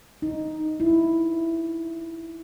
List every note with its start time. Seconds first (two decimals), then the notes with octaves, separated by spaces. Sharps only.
0.22 D#4
0.80 E4